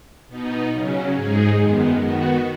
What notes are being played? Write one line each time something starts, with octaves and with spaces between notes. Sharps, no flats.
B2 B3 D#4
C#3 F#3 C#4
G#2 G#3 D#4 G#4
F#2 D#3 G#3 B3
D#3 B3 F#4